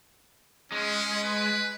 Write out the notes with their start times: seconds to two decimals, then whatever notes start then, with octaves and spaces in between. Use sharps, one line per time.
0.72 G#3 C#4
1.23 B4